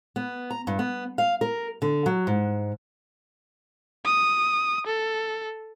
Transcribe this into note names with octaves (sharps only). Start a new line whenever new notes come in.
B3
A#5
G2
B3
F5
A#4
D3
F#3
G#2
D#6
A4